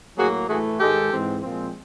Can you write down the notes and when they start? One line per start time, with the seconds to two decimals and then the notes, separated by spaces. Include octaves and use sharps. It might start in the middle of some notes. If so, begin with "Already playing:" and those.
0.17 A2 F#3 A#3 F#4 G#4
0.48 A2 E3 A3 F#4 G#4
0.79 G#2 D#3 G#3 G4 A4
1.10 G#2 E3 G#3 C4
1.42 A#2 F3 G#3 C4